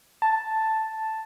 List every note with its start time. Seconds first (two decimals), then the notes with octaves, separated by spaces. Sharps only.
0.22 A5